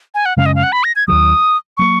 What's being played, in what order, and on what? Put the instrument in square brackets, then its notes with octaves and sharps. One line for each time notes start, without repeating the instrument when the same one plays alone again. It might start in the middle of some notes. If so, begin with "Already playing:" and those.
[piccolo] G#5
F#5
[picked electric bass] F#2 C#3 G#3 C#4 [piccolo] F5
[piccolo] D#5
F5
F#5
B5
A#6
G#6
[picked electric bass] D#2 D#3 F#3 [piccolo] D#6
[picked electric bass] F#3 A#3 [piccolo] C#6